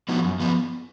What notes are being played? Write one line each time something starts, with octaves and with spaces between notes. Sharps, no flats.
F3 B3 D#4 F#4
F#2
F3 B3